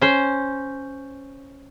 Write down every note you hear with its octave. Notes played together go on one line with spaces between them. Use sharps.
C#4 C5